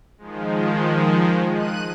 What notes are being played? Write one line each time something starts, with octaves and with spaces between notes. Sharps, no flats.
D#3 F3 G#3
F#6 D#7